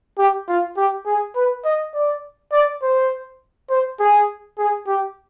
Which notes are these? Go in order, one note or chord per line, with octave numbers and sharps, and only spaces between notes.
G4
F4
G4
G#4
B4
D#5
D5
D5
C5
C5
G#4
G#4
G4